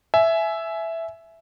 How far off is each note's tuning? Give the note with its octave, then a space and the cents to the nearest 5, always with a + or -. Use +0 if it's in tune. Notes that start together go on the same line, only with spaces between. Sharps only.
E5 +0 G#5 +25